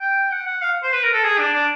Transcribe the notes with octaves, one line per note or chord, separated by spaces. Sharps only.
G5
F#5
F#5
F5
C5
B4
A#4
A4
G#4
D4
D4